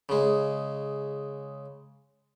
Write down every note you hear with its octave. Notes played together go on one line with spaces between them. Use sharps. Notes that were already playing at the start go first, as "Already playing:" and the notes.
C#3 G#3